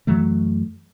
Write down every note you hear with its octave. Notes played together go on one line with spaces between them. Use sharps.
F#2 E3 F#3 A3